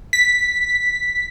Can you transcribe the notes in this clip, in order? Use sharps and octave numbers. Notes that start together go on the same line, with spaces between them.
B6